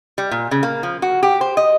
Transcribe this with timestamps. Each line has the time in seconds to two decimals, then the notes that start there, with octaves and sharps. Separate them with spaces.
0.18 G3
0.31 A#2
0.51 C#3
0.63 A#3
0.83 F3
1.02 F#4
1.23 G4
1.41 C5
1.57 D#5